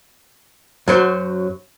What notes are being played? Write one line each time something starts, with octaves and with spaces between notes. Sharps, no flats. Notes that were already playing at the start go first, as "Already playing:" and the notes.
F#2 F#3 C5